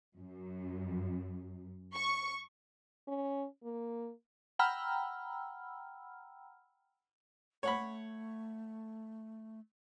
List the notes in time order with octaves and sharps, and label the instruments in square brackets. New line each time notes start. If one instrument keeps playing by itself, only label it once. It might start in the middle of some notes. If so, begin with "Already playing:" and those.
[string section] F#2
C#6
[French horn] C#4
A#3
[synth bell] F#5 G5 A#5 B5 E6 F6
[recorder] A3 [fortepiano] C#5 F#5 B5